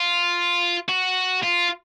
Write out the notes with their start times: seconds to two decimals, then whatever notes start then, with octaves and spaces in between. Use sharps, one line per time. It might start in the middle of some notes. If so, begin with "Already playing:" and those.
Already playing: F4
0.89 F#4
1.44 F4